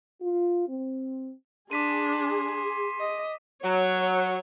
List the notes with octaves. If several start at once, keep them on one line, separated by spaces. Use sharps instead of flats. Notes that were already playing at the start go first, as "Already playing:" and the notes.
F4
C4
D4 G#4 C6 D6 B6 D#7
D#5
F#3 C#5